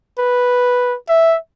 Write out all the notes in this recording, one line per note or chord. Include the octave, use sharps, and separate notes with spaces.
B4
E5